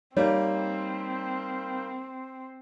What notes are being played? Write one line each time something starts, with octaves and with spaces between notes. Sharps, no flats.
G3 A#3 C4 D#4 C#5